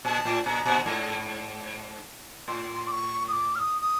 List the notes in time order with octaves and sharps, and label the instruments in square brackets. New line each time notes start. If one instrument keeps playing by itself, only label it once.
[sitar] A#2 [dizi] A5
[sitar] A2
[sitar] A#2 [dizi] A#5
[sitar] A#2
G#2
[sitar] A2 [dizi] C6
[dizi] D6
C#6
D#6
D6
F6
D#6
D#6